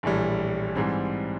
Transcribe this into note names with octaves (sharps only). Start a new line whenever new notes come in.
A#1 A2 E3 G3
G#2 E3 G3 C4